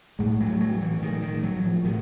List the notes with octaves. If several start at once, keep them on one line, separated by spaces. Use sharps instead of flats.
A2 G#3
F#3
A2
F#3
A2
E3
A2 D#3
D#3
A2
F#3
A2
F3
A2 D#3